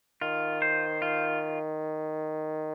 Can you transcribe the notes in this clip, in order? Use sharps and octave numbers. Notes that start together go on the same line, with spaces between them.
D#3 F4
C5
F4